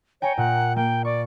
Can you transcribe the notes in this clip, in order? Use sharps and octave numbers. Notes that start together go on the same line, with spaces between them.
C#5 G5 G#5 A#5
A#2 F#5
A#3 G5
D5 C#6